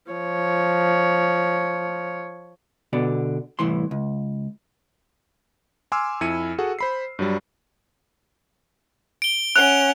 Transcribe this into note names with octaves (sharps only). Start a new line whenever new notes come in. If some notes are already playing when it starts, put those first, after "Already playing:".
F3 C#5
B2 D3 B3 D5
C2 A2 E3 C6
C#2
G#5 C6 D6 E6 F6
F2 E4 G#5 C#7 D#7
F#4 G#4 A4 F#5
C5 B5 C7
G2 F#3 G3
D7 G7
C#4 F#5 F#6 F7 G7